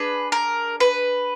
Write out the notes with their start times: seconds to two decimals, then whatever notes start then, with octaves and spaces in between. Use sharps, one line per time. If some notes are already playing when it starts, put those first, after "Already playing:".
Already playing: D4 G#4 B4
0.32 A#4
0.80 B4